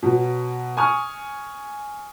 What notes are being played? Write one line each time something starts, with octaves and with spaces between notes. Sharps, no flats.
B2 F#3
G#5 C#6 D#6 F6